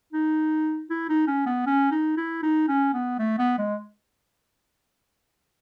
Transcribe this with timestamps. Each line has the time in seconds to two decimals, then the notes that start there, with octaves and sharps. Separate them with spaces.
0.13 D#4
0.90 E4
1.09 D#4
1.27 C#4
1.46 B3
1.66 C#4
1.91 D#4
2.17 E4
2.43 D#4
2.68 C#4
2.93 B3
3.19 A3
3.39 B3
3.58 G#3